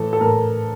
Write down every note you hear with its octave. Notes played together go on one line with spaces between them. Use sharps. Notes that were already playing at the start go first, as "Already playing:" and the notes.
Already playing: A2 E3 A4
A4
A2 A#4